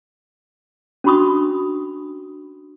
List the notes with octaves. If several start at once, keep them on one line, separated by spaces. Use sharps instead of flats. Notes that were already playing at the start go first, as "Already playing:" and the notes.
C#4 D4 F#4 B5 C#6 D#6